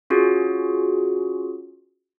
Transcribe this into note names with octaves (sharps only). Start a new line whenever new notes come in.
C#4 F4 F#4 G#4